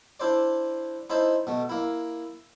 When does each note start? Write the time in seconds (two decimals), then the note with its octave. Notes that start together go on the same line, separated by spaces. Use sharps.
0.20 D4 E4 C5 D5
1.10 D#4 E4 C5 E5 A5
1.47 B2 A3
1.69 A#3 E4